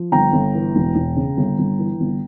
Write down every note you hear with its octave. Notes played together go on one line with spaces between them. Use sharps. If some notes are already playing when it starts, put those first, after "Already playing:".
Already playing: F3
G1 G5 A#5
G1
E3
E1
E1
C#3
G1
G1
E3
G1